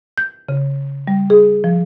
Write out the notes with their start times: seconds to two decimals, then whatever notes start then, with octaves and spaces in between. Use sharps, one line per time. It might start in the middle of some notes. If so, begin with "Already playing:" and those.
0.18 G6
0.49 C#3
1.07 G3
1.30 G#4
1.64 F3